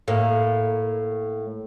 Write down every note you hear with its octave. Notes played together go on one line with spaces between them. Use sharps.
A2 A#3